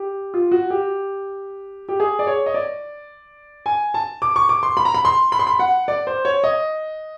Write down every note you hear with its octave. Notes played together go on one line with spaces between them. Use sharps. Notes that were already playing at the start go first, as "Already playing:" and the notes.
Already playing: G4
F4
F#4
G4
G4
G#4
D5
C#5
D#5
D5
G#5
A5
D6
C#6
D6
C6
B5
A#5
B5
C6
B5
C6
B5
F#5
D5
C5
C#5
D#5